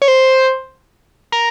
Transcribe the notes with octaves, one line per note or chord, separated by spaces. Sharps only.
C#5
C5
A#4